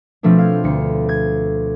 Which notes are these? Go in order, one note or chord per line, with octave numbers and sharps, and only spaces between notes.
B2 F3 A3 C4 D4
F5 G#6
D2 C#7
G#6